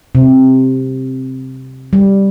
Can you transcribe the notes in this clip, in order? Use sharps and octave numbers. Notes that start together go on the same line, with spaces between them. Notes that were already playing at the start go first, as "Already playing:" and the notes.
C3
G3